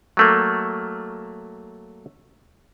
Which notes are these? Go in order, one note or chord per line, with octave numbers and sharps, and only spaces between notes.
F#3 A3 A#3